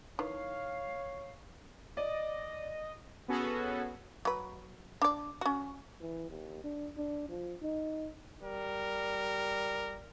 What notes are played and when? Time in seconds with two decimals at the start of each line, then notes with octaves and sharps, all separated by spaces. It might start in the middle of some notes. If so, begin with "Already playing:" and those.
0.19 D#3 E3 C#5 F5
1.97 D5 D#5
3.28 B3 C#4 F#4 G#4 A4
4.25 F#3 B4
5.02 D4 D5
5.41 C#4 F#4
6.02 E3
6.30 D#2
6.64 D4
6.97 D4
7.29 F3
7.63 D#4
8.43 G3 A#4